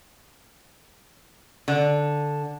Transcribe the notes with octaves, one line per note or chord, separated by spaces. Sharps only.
D3